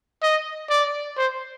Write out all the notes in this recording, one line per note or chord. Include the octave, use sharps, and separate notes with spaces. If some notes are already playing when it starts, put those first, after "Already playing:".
D#5
D5
C5